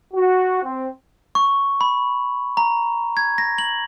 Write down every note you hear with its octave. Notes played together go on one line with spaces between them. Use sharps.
F#4
C4
C#6
B5
A#5
G#6
A#6
F#7